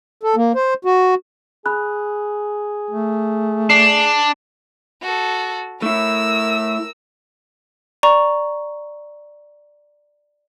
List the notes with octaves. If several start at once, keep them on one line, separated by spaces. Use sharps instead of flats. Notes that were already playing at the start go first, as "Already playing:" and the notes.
A4
A#3
C5
F#4
G#4 B5 F#6
A3
D4 C7
F#4 A4
A3 E4 A#4 E6
D5 A#5 C#6